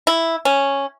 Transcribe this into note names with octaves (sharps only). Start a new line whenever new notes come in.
E4
C#4